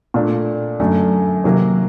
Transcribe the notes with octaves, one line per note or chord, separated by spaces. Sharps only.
A#2 A3 D4
F#2 D3 F#3 A3
C3 D#3 F#3 A#3